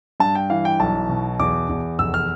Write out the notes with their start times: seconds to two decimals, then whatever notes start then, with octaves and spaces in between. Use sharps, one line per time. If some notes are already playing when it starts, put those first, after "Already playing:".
0.20 G2 A5
0.35 G5
0.50 E3 F5
0.65 G5
0.80 B1 A5
1.09 B2
1.39 E2 D6
1.69 E2
1.99 F1 E6
2.14 F6